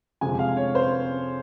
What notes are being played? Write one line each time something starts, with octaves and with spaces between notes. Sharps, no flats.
F2 C3 F3 G#3 G#5
F5
C#5
C5